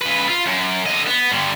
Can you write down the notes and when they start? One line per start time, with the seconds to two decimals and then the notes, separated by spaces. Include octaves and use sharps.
0.02 C#3 B4
0.28 F4
0.46 F#2
0.86 D3 D#5
1.07 B3
1.32 G2 D3